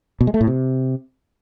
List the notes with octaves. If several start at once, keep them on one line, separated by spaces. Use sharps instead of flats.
B2
G#3
A3
A2
C3